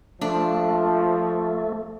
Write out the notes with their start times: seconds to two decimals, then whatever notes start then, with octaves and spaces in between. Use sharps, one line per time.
0.21 F3 A3 D4